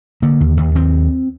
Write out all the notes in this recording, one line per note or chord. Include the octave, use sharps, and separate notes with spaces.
D3 A#3
D#2
D#2
D#2 C4